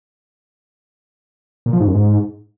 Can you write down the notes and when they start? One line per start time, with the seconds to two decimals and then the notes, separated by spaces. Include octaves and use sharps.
1.66 A#2
1.73 F3
1.80 G#2
1.87 F#2
1.94 G#2